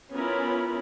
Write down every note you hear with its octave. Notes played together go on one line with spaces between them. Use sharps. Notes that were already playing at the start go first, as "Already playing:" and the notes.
B3 C#4 E4 F4 A#4 B5